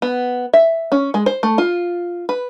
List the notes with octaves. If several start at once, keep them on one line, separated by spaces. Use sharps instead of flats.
B3
E5
C#4
G#3
C5
A3
F4
B4